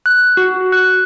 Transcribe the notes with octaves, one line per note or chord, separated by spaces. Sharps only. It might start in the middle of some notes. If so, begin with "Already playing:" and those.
F#6
F#4
F#6